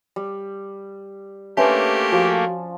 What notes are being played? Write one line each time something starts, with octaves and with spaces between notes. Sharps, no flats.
G3
A3 A#3 C#4 D4 G4 B4 E5 C6
F3 F#4